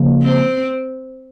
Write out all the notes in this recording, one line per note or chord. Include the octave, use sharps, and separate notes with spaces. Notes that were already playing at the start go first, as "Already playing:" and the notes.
Already playing: C#3 F3 A#3
C4